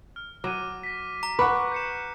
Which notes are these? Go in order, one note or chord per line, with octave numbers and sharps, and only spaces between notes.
F6
F#3 D6 D#7
A#6 B6
A#5
B4 F#5 C#6 D6 F#6
G6 C#7 E7